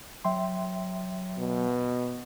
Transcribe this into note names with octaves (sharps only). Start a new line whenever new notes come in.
F#3 E5 G5 C6
B2